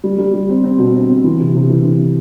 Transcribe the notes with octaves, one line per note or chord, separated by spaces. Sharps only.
G3
G3
G3
C4
C4
B2
C4
C4
E3
C3
C3
E3
E3